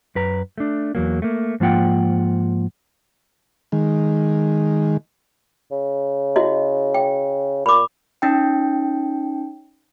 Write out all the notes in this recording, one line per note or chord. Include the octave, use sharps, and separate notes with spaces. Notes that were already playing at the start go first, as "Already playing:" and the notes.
F#2 B4 A#5
A3 D4
E2 F#3 A#3
A3 A#3
G#2 F3 A#3 F4 F#5 G5
D#3 G#3
C#3
E4 F#4 D#5
G5
A#2 B5 D6
C#4 D#4 G5